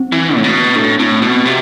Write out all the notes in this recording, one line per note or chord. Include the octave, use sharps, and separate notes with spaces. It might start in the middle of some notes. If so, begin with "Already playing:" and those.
Already playing: C4
E3
A2
B2
A2 D4
A2 C4
B2 C4
C3 C4